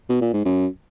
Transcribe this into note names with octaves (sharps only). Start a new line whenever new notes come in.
B2
A#2
G#2
F#2